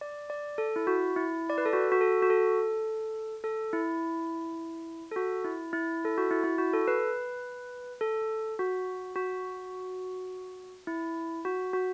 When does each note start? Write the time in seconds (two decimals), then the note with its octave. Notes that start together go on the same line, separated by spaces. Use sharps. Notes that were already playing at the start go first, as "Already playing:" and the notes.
0.01 D5
0.30 D5
0.58 A4
0.76 E4
0.87 F#4
1.16 E4
1.50 D5
1.58 B4
1.66 A4
1.73 F#4
1.92 F#4
2.01 A4
2.22 F#4
2.30 A4
3.44 A4
3.73 E4
5.11 A4
5.16 F#4
5.44 E4
5.73 E4
6.05 A4
6.17 F#4
6.31 E4
6.44 E4
6.58 F#4
6.73 A4
6.88 B4
8.01 A4
8.59 F#4
9.16 F#4
10.87 E4
11.45 F#4
11.73 F#4